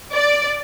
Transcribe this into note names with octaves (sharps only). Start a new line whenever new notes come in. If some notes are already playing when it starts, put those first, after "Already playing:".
D5